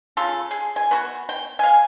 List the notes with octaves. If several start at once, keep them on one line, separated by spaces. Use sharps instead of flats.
C#3 F4 A4
G#4
G#5
B3 F#4
G5
F5 G#5